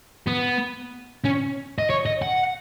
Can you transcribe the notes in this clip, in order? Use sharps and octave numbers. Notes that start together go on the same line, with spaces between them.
B3
C#4
D#5
C#5
D#5
F#5